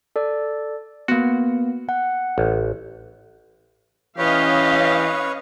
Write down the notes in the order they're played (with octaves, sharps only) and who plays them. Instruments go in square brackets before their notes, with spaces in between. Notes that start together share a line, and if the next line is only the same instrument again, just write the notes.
[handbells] A4 D5
[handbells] A#3 B3 [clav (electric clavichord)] F#4
[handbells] F#5
[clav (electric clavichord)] A1
[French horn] E3 [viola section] C#4 D#5 F5 [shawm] G4 [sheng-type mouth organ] B4 C#5